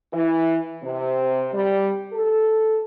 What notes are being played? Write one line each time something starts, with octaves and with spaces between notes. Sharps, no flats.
E3
C3
G3
A4